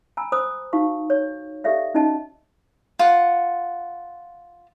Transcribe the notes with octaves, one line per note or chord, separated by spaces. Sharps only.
G#5 A#5 B5 E6
C5 B5 D#6 E6
D#4 F#4 F5 C#6
C#5
G4 A4 D5 E5 F5
C#4 D#4 F#4 D#5 A5
F4 F#5